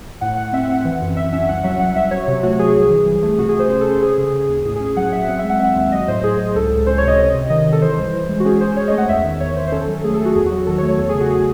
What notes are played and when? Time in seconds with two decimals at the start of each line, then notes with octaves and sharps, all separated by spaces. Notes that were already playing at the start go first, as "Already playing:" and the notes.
0.21 A2 F#5
0.37 A2 F#5
0.53 C4 E5
0.63 F#5
0.69 C4
0.75 F#5
0.85 E3
1.01 F#2
1.16 F#2 E5
1.33 C#4 E5
1.48 C2 F#5
1.64 F#3 E5
1.80 F#3 F#5
1.95 C2 E5
2.11 F#3 C#5
2.28 C3
2.43 A3 F#4
2.59 F#3 G#4
2.74 C2
2.90 E3
3.07 C2
3.22 A3
3.38 C3 F#4
3.49 G#4
3.54 C3 C5
3.69 C#4 C5
3.81 A4
3.85 C#4
3.91 C5
4.01 C#4 G#4
4.18 C#3
4.34 C#3
4.49 D#2
4.65 A2 G#4
4.76 G#4
4.81 C#4
4.86 G#4
4.97 F#3 F#5
5.12 F#3 E5
5.28 C4 F#5
5.39 E5
5.44 G#3
5.49 F#5
5.60 C4 E5
5.76 D#2
5.92 F#3 D#5
6.08 A2 C5
6.24 A2 G#4
6.40 A2
6.55 C#2 A4
6.71 C#2
6.87 C#4 C5
6.98 C#5
7.03 C3 D#5
7.19 C3
7.34 C3
7.50 D#3 D#5
7.66 D#3
7.72 A4
7.82 E3 C5
7.98 C2
8.14 E3
8.29 G#3
8.40 F#4
8.45 C#4 G#4
8.60 C#4 C5
8.77 C#4 C#5
8.88 A3 D#5
8.98 F#5
9.08 E2 E5
9.24 D#3
9.40 E2 C#5
9.56 D#3 C5
9.68 C5
9.72 C#4 A4
9.88 F#3
10.04 A3 G#4
10.14 A4
10.20 A3
10.25 F#4
10.35 E2 G#4
10.46 F#4
10.51 F#3
10.66 D#3 A4
10.78 C#5
10.83 A3
10.88 C#5
10.98 E2 A4
11.09 G#4
11.14 C#3
11.20 F#4
11.30 G#4